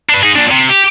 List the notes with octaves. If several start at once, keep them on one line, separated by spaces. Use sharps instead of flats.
D4 B4
D#4 G#4
A#2 D4
C3
G4